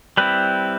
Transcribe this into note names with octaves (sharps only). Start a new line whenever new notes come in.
G3 C4 E4 B4